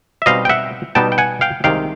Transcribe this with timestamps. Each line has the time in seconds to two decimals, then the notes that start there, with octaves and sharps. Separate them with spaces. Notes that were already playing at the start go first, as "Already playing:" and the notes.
0.22 E5
0.26 B2 G3 C4 D#4 D#5 F5
0.45 G5
0.49 E5 F#5
0.95 B2 G3 B3 D#4 G5 A5
1.12 G5
1.18 F#5 G#5
1.41 F5 G5
1.64 C2 C3 D#3 G#3 F5 G5